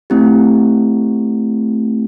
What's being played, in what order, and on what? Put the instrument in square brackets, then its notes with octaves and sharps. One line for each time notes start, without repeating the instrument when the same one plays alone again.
[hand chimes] A3 C4 E4 G4